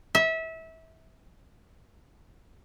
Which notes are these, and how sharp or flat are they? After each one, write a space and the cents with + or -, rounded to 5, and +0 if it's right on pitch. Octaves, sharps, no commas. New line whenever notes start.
E5 -25